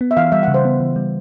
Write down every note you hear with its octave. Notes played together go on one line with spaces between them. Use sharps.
B3
E5
E3 F5
G3 E5
F#5
C#3
C5
B3
E3
G3